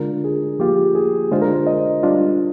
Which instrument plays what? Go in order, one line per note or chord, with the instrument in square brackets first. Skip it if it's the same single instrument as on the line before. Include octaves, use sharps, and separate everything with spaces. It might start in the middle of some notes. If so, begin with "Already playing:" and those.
Already playing: [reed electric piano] D3 G#3 D4 F4 [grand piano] A#4
[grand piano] G#4
[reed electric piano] F3 A#3 F4 [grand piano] G4
[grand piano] G#4
[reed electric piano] D3 G#3 D4 F4 [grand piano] C5
[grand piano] A#4
C5
D#5
[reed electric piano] G3 D4 F4